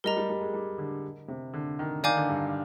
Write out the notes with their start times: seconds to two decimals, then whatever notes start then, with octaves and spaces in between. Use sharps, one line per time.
0.04 G3 A#4 D#5 A#5
0.17 G3
0.29 G3
0.41 G#3
0.54 G3
0.78 D3
1.28 C3
1.54 D3
1.79 D#3
2.03 D#3 D5 F5 G#5 D6 G6
2.17 D3
2.29 G2